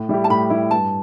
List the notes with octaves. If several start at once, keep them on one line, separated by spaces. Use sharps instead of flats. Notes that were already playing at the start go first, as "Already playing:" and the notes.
Already playing: A2
G3 E4 G4
A5
A2 B5
G3 E4 G4
G2 A5